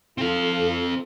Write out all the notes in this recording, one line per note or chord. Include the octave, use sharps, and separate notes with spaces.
C4 F4 A4 F5